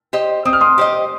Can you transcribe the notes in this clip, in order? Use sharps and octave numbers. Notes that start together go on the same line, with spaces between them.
G4 C5 D#5
C4 D#6
F6
C6 D#6
G4 C5 D#5